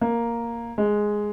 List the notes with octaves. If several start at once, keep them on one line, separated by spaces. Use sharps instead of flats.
A#3
G#3